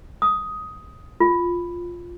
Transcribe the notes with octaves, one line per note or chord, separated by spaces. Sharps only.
D#6
F4